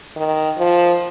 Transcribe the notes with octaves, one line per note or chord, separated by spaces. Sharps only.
D#3
F3